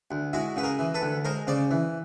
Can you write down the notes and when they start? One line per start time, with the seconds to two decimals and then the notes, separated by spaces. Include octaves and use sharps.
0.11 D2
0.33 G#3 E4 F#4
0.56 C#3 B4
0.63 G#4 A#4
0.79 E3
0.94 A4 B4
1.02 D2
1.25 G#3 A#4 C5
1.47 C#3 C5 D5
1.71 E3